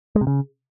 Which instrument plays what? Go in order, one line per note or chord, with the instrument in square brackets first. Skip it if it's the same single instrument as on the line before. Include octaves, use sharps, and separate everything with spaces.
[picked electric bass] G#3
C3
C#3